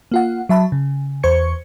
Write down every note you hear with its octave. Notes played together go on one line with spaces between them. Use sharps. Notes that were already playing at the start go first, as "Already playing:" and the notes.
A#3 F4 F#5
F#3 E5 A5 B5
C#3
E2 C5 C#6 G#6 C#7